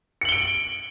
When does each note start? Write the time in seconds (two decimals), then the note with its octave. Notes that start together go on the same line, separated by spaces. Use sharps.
0.21 C#7
0.25 F#7
0.29 G7
0.32 D7